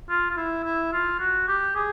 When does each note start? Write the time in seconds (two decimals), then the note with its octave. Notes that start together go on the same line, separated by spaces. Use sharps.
0.09 F4
0.30 F4
0.37 E4
0.64 E4
0.93 F4
1.20 F#4
1.48 G4
1.76 G#4